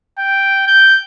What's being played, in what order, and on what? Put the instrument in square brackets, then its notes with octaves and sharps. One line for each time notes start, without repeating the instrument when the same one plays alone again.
[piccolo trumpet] G5
G6